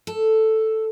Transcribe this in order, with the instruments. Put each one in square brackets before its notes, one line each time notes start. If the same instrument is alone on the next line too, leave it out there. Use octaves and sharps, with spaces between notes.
[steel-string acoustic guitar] A4